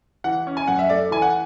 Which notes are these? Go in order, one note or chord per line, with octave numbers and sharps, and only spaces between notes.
E3 F#5
C#4
G#5
F#2 F#5
E5
A3 D5
E3 G#5
F#5